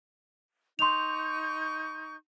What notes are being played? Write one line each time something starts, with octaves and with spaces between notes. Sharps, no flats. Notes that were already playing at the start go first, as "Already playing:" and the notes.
D#4 C6 C#6 G6 F7